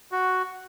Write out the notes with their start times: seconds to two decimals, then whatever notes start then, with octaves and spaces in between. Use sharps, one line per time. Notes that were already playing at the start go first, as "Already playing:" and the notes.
0.12 F#4